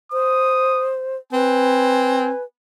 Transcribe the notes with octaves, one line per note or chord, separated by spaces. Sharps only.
C5 D#6
C4 B4 G#5